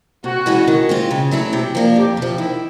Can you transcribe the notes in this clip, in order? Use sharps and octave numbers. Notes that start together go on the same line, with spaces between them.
C3 F#4
E3 G#3 C#4
D#3
G#3 C4 F4
C#3
F#3 A3 C#4 E4
C3 G4
F3 A#3 D4
F2 G4
C3 F3
D#3 E4